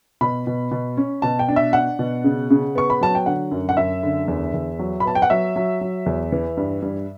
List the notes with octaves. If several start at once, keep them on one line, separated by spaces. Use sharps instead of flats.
B2 B5
B2
B2
C#4
B2 A5
G5
D4
E5
D4 F#5
B2
C#3
C#3
B3 C#6
B5
F#3 A5
G5
D3 F#5
F#2
F#5
F#2 E5
D3
E2
E2
F#3
B5
B3 A5
G5
F#5
F#3 E5
F#3
F#3
E2
E3
G2
G2